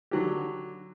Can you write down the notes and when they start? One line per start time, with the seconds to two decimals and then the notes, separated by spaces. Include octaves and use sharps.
0.11 D3 F#3 G4